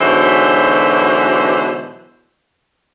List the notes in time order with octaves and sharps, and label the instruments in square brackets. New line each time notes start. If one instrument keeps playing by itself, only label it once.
[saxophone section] G#2 B2 D3 E3 F#3 C5